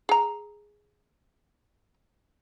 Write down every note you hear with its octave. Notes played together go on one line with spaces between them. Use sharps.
G#4 A#5